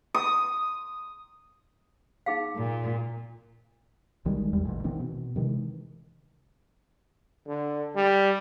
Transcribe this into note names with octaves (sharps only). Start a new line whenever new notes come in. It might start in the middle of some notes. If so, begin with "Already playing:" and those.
D#6
D#4 G#4 F5
A#2
B1 D#3 G3 G#3
A#1 E2 G3
A1 B2 E3
D#3 E3 B3 C4
B2
C3 D#3 E3 G#3
D3
G3